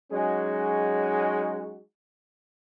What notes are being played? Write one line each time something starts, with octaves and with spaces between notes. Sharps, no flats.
F#3 G#3 C#4 D#4 F#4 G#4